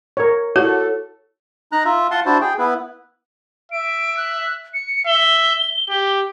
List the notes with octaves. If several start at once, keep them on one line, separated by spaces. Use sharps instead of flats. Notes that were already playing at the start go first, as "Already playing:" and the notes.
A#4 C#5
E4 F#4 A4 C#5
D#4 A#5 F#6
F4 E5
F4 F#5 A5 C6
D4 E4 F#4 C5 A5
G#4 G5
B3 E4 B4
E5 D7
F#6
C#7
E5 G7
G4